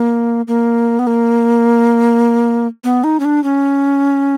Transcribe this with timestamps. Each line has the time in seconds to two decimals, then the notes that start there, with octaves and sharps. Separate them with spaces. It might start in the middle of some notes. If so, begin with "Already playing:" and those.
Already playing: A#3
0.48 A#3
0.99 B3
1.07 A#3
2.84 B3
3.04 D#4
3.20 C#4
3.25 D4
3.44 C#4